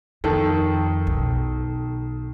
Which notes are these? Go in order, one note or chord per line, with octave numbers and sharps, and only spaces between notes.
F2 D#3 A4
B1